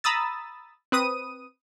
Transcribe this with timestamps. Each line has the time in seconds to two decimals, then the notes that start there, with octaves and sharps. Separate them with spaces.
0.04 A#5 B5 D#6 E6 A6
0.92 C4 B4 D#6 D#7